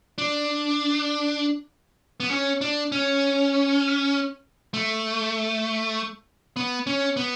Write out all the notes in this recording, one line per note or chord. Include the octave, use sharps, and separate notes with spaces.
D4
B3
C#4
D4
C#4
A3
B3
C#4
B3